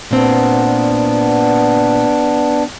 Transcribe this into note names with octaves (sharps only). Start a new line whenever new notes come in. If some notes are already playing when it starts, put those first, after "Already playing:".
A#2 B3 C4 D4